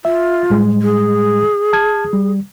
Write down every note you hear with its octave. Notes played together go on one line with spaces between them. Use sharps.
F4 E5
A2 G3 G#3
G#4
A5 F6 G#6
G3